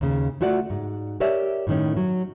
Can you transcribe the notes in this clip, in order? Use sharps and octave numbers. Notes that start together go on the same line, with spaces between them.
D#2 C#3
A3 F4 F#4 D5 F#5
G#2
G4 A#4 C#5 D5 E5
A2 D#3 C#4
F#3